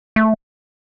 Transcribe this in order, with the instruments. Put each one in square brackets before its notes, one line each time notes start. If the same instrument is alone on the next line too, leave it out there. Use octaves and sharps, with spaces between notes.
[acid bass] A3